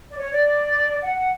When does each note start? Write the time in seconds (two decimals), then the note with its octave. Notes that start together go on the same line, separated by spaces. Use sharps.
0.11 D5
0.17 C#5
0.31 D5
1.03 F#5